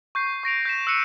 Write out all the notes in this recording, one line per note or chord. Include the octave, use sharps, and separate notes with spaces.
C#6 G6 C7
C#6 A#6 D7 F7
G6 B6 E7
E6 F#6 C#7 D#7